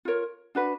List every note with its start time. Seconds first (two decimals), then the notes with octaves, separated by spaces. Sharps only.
0.05 F4 A#4 C#5
0.55 D4 F#4 B4